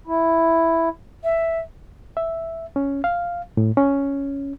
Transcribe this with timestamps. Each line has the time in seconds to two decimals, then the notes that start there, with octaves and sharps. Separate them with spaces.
0.07 E4
1.24 E5
2.17 E5
2.76 C#4
3.04 F5
3.57 A2
3.77 C#4